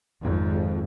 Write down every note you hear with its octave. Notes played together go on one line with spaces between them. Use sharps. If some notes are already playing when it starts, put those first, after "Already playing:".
G#1 F2 G#2